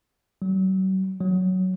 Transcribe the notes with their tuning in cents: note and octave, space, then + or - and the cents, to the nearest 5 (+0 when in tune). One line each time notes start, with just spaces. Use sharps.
F#3 +40
F#3 +5